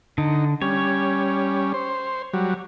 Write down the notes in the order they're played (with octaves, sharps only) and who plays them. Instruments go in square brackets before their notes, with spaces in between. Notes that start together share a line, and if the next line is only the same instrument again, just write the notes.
[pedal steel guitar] D3 [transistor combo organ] D#4
[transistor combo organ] G3 C#4 [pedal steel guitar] C#5
[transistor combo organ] C5
F#3 G3